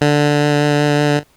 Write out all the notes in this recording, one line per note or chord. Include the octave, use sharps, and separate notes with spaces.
D3